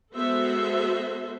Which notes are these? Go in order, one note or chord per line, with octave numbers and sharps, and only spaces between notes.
G#3 B3 F#4 A4 C5 E5